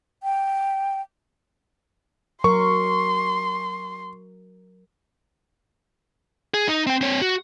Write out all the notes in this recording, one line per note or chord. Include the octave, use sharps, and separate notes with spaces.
G5
F#3 A#4 C6 C#6
G#4
D#4
C4 G5
C4 C#5
F#4